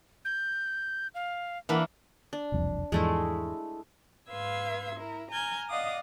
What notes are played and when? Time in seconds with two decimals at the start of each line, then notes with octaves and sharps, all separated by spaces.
0.25 G6
1.14 F5
1.69 E3 A#3 D4 B5
2.33 D4
2.52 E1 C2 F2
2.92 E2 G#2 F3 G#3 A3 E4
4.30 G#2 B4 F5 C6 E6 G#6
4.96 E4 A#4
5.32 G#5 A#5 F6 G6 G#6
5.70 D5 D#5 F5 F#5 D6 D#6